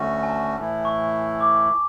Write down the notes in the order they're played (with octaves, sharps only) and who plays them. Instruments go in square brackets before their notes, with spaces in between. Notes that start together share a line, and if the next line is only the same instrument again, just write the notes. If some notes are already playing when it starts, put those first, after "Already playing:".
Already playing: [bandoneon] D2 D3 A3 C#4 F#4
[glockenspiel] G#5
A5
[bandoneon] A2 E3 A3 E4
[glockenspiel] C#6
D6